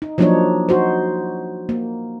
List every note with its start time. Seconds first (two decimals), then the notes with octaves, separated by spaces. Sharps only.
0.02 D#4
0.18 F3 F#3 A#3 D4 D#4 C#5
0.69 D#4 F#4 C5
1.69 A#3